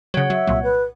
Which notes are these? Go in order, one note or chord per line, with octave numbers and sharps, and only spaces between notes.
C#3 F#3 C#5 F#5
F#3 E5
C2 A#2 F#3
B4